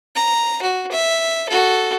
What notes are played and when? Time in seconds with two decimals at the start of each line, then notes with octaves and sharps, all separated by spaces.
0.15 A#5
0.62 F#4
0.92 E5
1.49 F#4 A4